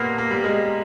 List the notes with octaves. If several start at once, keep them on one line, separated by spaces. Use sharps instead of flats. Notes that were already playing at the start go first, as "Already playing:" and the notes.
Already playing: A#2 G3 A#3 B3
A#3
G3
G#3